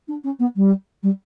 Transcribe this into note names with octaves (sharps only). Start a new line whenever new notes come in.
D4
C#4
B3
G3
G3